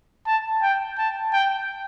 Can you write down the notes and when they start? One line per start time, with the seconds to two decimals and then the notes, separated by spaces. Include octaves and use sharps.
0.26 A5
0.62 G5
0.98 A5
1.33 G5